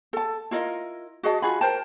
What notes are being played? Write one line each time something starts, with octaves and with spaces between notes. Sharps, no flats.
A4 A5
E4 F4 A#4 D#5
F#4 G#4 D#5 A5
F4 F#4 G#4 B5
A#4 C5 G5 A5